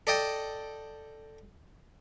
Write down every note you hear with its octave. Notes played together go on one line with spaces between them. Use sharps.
A4 D5 D#5 G5 A5